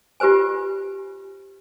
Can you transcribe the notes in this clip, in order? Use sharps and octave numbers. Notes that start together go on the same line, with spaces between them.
F4 G4 B4 C5 G#5